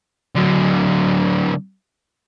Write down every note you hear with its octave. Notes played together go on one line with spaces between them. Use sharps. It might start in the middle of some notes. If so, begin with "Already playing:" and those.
D3 F#3